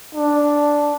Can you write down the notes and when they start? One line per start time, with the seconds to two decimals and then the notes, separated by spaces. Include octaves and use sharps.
0.15 D4